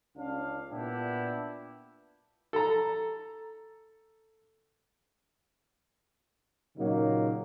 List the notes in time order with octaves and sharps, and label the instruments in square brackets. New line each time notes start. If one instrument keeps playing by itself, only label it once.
[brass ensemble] C#2 C#4 D4 F5
A#2 B3 D4 E4 G4
[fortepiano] A4 A#5
[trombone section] A#2 C#3 F#3 A#3 D#4